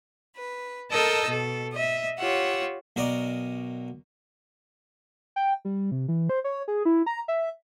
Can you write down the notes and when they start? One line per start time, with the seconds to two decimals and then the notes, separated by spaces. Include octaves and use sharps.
0.34 B4
0.90 A4 A#4 D#5 A5 E6 G6
1.27 B2 A4
1.71 D#5 E5
2.19 F4 G4 C#5 F#5 E6
2.96 B1 F#4 A#4 D5 D#5
5.36 G5
5.65 G3
5.92 C3
6.08 E3
6.29 C5
6.44 C#5
6.68 G#4
6.85 E4
7.06 A#5
7.28 E5